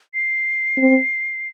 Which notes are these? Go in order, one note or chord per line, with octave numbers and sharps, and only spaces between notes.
C7
C4